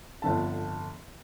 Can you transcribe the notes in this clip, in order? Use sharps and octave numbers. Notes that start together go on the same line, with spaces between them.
G1 F2 D3 A5